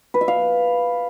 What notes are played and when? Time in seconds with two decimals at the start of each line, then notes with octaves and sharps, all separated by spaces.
0.14 B4
0.21 E5
0.28 F5